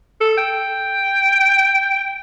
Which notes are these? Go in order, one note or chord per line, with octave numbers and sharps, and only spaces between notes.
A4
G5